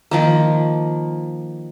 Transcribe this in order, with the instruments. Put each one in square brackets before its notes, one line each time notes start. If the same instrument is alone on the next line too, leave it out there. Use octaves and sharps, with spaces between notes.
[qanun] D#3 F3 A#3